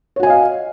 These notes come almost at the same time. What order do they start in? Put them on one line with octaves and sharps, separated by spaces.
C#5 F#4 G#5 D#5 F5